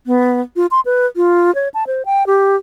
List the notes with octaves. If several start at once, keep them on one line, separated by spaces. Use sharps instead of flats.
B3
F4
C6
B4
F4
C#5
A5
C5
G5
G4